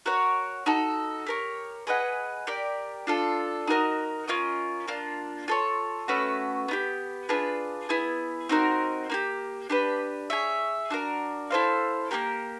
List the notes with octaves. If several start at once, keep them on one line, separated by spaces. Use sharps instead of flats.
F#4 A#4 C#5 F#5
D#4 F#4 A4
G4 A#4 C#5
G#4 B4 D#5 F#5
G4 A#4 D5
D4 F4 A4
D#4 F#4 A#4 D#5
C#4 F4 A#4 D#5
A#3 D4 F4
F4 A4 C#5
A3 C#4 F#4 B4
B3 D#4 G4
D4 F4 G#4 B4
B3 E4 G#4
C4 D#4 F#4 A#4
A#3 D#4 G4
D4 G4 B4
G#4 C#5 E5
D4 F#4 A#4
E4 A4 C5 F5
A#3 D4 G4 A#4